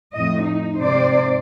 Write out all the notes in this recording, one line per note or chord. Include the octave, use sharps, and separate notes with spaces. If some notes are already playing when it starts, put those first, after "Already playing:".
F2 A2 D#5
D#4
G#2 C3 C5 D5